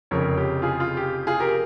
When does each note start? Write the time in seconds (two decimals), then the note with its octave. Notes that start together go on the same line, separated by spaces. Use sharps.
0.11 F1 F2 C#3 A#4 C#5
0.37 G4
0.62 F4 G#4
0.80 F4
0.97 G4
1.27 F4 G#4
1.40 G4 A#4